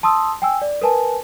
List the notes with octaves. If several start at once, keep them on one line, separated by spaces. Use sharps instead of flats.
A5 C6 D#6 E6
G5 G#5 E6
D5
A#4 B4 G#5 A5